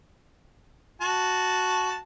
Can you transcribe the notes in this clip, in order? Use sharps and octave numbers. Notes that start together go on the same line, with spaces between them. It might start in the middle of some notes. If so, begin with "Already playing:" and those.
F#4 A5